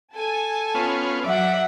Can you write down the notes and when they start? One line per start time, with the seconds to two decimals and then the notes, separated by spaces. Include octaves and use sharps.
0.15 A4 G#5 A5
0.75 B3 C#4 F4
1.24 F#3 D5 E5 F#5